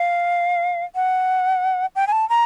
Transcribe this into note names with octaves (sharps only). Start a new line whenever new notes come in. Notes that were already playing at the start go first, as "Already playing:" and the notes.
Already playing: F5
F#5
G5
G#5
A5
A#5